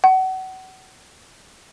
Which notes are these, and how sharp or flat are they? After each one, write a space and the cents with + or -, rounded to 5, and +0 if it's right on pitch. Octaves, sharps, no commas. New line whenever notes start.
F#5 +30